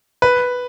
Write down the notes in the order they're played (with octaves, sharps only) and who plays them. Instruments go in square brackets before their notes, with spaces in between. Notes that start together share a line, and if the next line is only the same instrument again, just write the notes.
[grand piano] B4